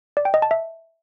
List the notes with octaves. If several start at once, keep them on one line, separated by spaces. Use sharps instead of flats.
D5
G5
D#5
A5
E5